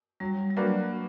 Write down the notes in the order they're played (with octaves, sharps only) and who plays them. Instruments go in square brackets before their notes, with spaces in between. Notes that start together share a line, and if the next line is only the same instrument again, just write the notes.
[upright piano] F#3 [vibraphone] G3
[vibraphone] G3
[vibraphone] F#3 [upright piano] A#3 D4 F#4 B4